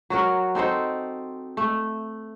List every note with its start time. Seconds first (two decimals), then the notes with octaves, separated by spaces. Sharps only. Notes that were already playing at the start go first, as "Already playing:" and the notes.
0.10 F#3 F#4 A#4
0.55 C4 D#4 A4 C5
1.57 A3